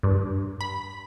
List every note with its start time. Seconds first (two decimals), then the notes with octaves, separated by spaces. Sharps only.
0.03 G2
0.61 B5